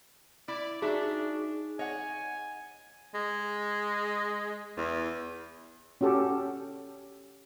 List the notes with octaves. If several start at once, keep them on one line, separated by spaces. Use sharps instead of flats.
E4 D5
D4 D#4 F#4 G#4 E5
C#5 D#5 F#5 G#5
G#3
E2
C#4 F#4 G4 A4